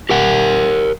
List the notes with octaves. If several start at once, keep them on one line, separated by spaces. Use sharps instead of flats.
G4 A#4 F#5